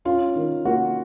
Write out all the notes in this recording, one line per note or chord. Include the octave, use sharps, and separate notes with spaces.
C#4 F4
D#3
A#3 F#4